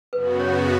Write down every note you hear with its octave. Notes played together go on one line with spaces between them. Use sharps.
F#2 C#3 B3 F#4 B4
C#5